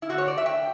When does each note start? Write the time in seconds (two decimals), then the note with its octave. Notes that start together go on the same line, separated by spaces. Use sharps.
0.02 E4
0.09 D3 A3 D4 F#4
0.18 C#5
0.28 D5
0.37 E5
0.46 G5